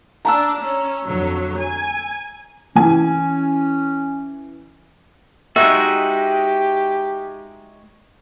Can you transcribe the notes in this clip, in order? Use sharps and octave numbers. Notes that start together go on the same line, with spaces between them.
D4 A#5 B5 E6
C#4
F2 D3 F#3
G#5
E3 C#4 G#5
G#3 D#4 F#4 G4 E5